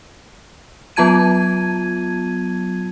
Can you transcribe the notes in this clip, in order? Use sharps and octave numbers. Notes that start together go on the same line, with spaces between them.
F#3 B3 F4 A5 G#6 D#7